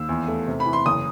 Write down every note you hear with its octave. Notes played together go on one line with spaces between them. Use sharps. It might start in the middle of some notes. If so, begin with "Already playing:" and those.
Already playing: D#2 E6
E2
A3
C3
B5
E3
C6
F#1 D#6